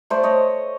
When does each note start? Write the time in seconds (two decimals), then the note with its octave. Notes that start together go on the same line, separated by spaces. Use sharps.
0.10 A3 C5 D5
0.23 C#5 D#5